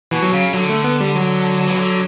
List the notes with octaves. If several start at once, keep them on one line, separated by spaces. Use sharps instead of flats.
B2 E3
F#3
C#3
D3 F#3
A3
B3
G3
F#3
E3
D3